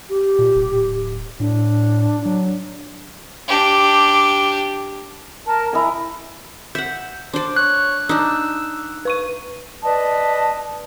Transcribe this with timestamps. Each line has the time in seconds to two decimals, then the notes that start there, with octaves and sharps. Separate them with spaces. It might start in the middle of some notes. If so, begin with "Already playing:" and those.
0.10 G4
0.39 A#2
0.55 D1
1.40 A2 D4
2.26 F#3
3.48 D4 G4
5.47 A#4 A5
5.73 E4 D#5 G#5 A#5
6.75 E5 F#5 G6
7.33 D4 C5 D5
7.56 C#5 F#6
8.09 D4 D#4 E6
9.05 B4 C#6 D#7
9.85 B4 D5 D#5 A5